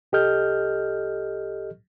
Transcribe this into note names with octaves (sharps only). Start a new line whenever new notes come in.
C2 G4 A4 D#5 F6 G6